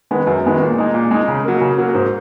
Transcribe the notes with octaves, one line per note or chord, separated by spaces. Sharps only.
D#3 G#3 B3
F#2
D#3 G#3 B3
A#2
G#3 D#4
A#2
G#3 D#4
C#3
F#3 A#3
C#3
F#3 A#3
G#2